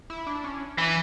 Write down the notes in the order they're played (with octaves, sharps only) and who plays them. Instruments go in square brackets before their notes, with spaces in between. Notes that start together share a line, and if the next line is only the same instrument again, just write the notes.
[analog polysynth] E4
D4
C#4
[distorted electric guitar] E3 [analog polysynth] E4